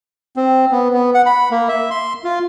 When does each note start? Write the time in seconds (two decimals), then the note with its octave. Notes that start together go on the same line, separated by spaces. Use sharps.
0.36 C4
0.71 B3
0.93 B3
1.14 F#5
1.26 B5
1.51 A#3
1.68 E5
1.90 C6
2.24 F4